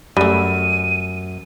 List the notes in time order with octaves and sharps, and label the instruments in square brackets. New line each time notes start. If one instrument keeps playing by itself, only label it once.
[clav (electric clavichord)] F#2 [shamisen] G3 A3 [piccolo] D#7